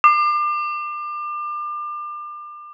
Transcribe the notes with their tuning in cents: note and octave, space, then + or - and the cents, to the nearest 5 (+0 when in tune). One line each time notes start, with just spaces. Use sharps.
D6 +35